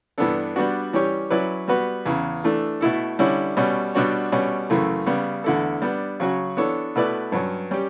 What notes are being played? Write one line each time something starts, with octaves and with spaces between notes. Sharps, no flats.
G2 E3 B3 D4 A4
G3 B3 D4 F#4
E3 G3 C#4 G4 C#5
F#3 C#4 E4 B4 D5
G3 B3 F#4 B4
E2 C#3 E3
E3 A3 D4
B2 A3 E4 A4
D3 G3 C#4 E4
B2 G3 C#4
B2 G3 D4 F#4 C#5
B2 G3 C#4
F#2 C#3 E3 A3
C#3 G3 B3
E2 D3 A3 E4 A4
G3 B3 D4
C#3 F#3 C#4 F#4
E3 B3 D4 A4 C#5
B2 A3 E4 B4 D5
G2 F#3 C#4
G3 C#4 G4